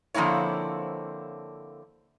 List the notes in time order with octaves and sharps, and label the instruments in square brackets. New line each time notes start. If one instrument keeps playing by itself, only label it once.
[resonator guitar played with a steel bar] D3 F3 A#3 C4 E4 C#5